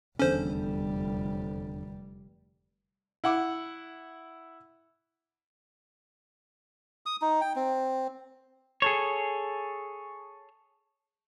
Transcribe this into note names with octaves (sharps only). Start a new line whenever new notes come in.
F1 E2 D3 G3 C#4 A4 C5
E4 F#5 D6
D#6
D#4
G5
C4
G#4 A4 C#5